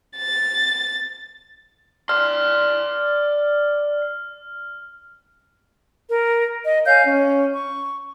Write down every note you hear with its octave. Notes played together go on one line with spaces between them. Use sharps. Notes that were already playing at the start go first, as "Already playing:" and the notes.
A6
D5 C6 F6
A#4
D#5
C#5 F5 G#5 G6
C#4
C#6